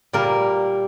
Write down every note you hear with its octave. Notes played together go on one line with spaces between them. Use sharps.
A#2 G3 A#3 A#4